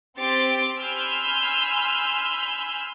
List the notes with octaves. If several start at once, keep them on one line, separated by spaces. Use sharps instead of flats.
C4 G4 C6 A6 D7
G#5 B5 C6 E6 F6 G6